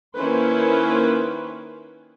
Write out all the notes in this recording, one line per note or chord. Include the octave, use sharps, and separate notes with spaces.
D#3 A#3 C#4 E4 B4 C5